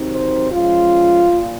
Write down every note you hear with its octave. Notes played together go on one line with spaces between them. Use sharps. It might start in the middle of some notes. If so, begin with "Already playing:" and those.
Already playing: C3 D#3 F#3 C4 D#4
C5
F3 G#3 C#4 F4
A#2